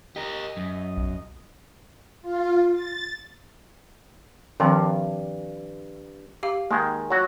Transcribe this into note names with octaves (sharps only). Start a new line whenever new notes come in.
G4 A#4 D#5
F#2
B1
F4
A6
G2 D#3 F3 C4
G4 F5
D#3 G#3 A#3
F#3 F#4